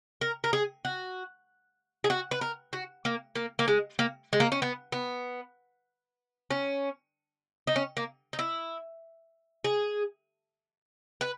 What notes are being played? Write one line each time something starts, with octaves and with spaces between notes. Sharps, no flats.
A#4
A#4
G#4
F#4
G#4
F#4
B4
A#4
F#4
A#3
A#3
A#3
G#3
A#3
G#3
A#3
C#4
B3
B3
C#4
D#4
C#4
A#3
D#4
E4
G#4
B4